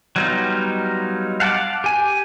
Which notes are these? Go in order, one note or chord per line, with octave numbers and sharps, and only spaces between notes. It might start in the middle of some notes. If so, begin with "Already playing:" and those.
F#3 G3 B3 D#4 F4
F5 F#5 A5 C6 D6
G4 G#5